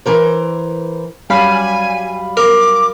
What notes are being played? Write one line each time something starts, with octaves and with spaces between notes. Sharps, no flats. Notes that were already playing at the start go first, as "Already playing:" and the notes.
E3 A#4 C5
F#2 G3 F5 G#5 B5
A#4 D6